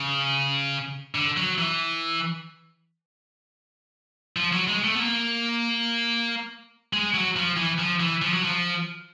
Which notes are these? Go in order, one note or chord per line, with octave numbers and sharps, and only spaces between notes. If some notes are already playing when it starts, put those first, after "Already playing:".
Already playing: C#3
D3
F#3
E3
F3
F#3
G#3
A3
B3
A#3
G#3
F#3
F3
E3
F3
E3
F3
F#3
F3